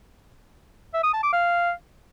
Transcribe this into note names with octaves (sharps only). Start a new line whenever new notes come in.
E5
D#6
A5
D6
F5